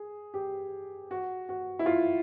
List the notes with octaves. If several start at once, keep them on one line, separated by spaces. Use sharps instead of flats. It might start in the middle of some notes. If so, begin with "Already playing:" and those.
Already playing: G#4
G4
F#4
F#4
E4
F4